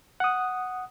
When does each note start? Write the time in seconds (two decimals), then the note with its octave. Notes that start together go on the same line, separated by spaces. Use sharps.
0.20 F#5 D#6